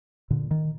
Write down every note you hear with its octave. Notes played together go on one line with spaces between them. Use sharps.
A#2 D3
D#3